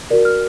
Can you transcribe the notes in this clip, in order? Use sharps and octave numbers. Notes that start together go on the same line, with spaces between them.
F#4 A#4 D5
F6